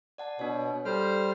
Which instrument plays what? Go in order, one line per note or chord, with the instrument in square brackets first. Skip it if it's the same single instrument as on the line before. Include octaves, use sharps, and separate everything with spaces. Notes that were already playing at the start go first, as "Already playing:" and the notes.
[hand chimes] D5 F#5 A5
[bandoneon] B2 [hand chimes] D4 C#5
[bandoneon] G3 C5 F6 [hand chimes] A4